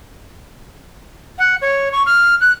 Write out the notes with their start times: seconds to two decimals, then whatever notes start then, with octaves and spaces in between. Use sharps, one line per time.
1.38 F#5
1.61 C#5
1.92 C#6
2.06 F6
2.41 F#6